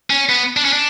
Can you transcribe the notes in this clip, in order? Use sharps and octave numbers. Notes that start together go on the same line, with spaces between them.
C#4
B3
D4
C#4
D4